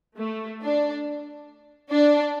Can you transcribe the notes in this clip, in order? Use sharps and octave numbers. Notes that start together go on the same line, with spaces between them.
A3
D4
D4